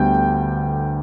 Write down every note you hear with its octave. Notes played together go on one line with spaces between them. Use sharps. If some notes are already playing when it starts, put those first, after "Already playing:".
Already playing: D2 D3 G3 B3 G5